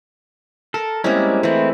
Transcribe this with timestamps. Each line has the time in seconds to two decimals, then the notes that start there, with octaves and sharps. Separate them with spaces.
0.74 A4 A#4
1.04 G3 G#3 A#3 C4 C#4 E4
1.43 E3 G#3 A3 C4 E4